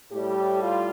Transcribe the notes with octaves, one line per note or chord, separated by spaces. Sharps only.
A2 G3 G4
F4